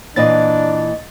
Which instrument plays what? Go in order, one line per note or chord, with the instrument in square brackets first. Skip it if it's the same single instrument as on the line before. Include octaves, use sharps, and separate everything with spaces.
[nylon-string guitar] A#2 E3 C4 [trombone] D4 [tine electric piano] D#5 A6